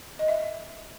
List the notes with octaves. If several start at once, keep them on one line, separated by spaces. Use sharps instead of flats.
D#5
E5